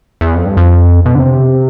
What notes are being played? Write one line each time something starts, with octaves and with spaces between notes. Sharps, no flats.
E2
F2
G2
F2
B2
D3
C3